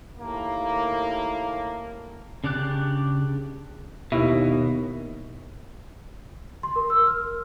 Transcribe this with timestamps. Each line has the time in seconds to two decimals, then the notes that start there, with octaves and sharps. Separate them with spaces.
0.17 D#2 A2 A#3
2.44 C#3 D4 G4 D5 F#6
4.12 D#2 B2 E4
6.63 C6
6.76 A#4
6.90 E6
7.07 F6